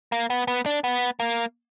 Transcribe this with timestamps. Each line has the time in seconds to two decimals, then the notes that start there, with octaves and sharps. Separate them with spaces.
0.12 A#3
0.30 B3
0.48 B3
0.66 D4
0.84 B3
1.20 A#3